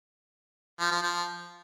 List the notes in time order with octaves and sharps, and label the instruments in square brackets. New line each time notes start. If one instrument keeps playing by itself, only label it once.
[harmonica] F3
F3
F3